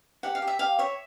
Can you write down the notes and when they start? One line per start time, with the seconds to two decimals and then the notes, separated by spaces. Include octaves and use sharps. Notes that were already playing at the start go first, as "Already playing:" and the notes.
0.23 G4 F#5
0.35 F5
0.42 G4
0.47 E5
0.59 G4 F5
0.79 C#5 E5